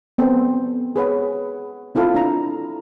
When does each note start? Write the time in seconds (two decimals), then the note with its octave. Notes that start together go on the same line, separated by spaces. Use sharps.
0.18 B3 C4 A4
0.96 G#4 B4 C#5 F#5
1.95 C4 E4 F4 A4 F5
2.15 D4 A#5